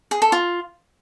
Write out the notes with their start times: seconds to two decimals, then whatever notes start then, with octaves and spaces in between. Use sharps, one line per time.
0.11 G#4
0.22 A4
0.32 F4